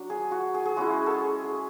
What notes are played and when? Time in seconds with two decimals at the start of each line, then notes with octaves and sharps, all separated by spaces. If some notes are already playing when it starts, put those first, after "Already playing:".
Already playing: F#3 D4
0.10 G#4
0.31 F#4
0.54 G#4
0.66 G#4
0.76 G#3 C#4 E4 F#4
1.06 G#4 A4
1.44 G#4